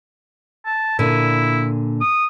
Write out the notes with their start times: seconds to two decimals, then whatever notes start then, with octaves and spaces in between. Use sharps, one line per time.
0.66 A5
0.99 A#2 D3 E4 G#5
2.01 D#6